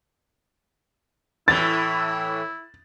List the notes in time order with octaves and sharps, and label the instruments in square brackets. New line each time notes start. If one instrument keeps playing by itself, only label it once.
[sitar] A2 E3 [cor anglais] E4 [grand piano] A6